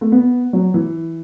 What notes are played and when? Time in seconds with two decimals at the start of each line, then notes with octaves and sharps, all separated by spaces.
0.01 A3
0.12 B3
0.53 F#3
0.74 E3